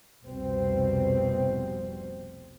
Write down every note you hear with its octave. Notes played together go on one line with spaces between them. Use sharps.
F1 C2 B2 G3 C4